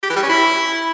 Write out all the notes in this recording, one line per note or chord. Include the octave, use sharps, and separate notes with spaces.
G4
E3
G3
C#4
E4